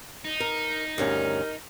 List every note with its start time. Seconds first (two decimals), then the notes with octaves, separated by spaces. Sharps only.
0.25 D#4
0.40 A#4
0.98 D2 G2 C#4 A#4